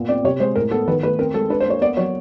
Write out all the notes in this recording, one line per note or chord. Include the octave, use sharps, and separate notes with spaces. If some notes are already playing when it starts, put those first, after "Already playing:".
Already playing: A#2 B3
C4 D5
C3 C#5
G#3 C5
A2 A#4
B3 A4
D#3 B4
A3 B4
C4 A#4
G#3 A4
D4 B4
C5
A#3 C#5
B3 D5
F#3 C#5